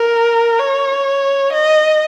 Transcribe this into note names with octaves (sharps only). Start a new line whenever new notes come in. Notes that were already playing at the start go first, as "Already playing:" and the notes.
Already playing: A#4
C#5
D#5